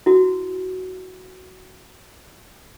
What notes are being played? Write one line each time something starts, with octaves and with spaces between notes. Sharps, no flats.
E4 F#4